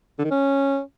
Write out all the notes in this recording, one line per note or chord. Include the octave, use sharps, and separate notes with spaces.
D3
D#3
C#4